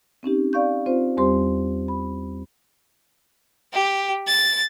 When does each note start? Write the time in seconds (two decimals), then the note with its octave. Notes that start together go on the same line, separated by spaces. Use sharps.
0.23 C4 C#4 D#4 G4
0.53 D5 F5 C#6 G6
0.86 C4 F4 C5
1.17 E2 G3 C4 G4 C5 C6
1.88 B5
3.73 G4
4.27 A6